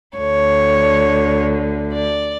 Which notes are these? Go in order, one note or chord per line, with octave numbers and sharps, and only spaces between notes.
D2 D3 C#5
D5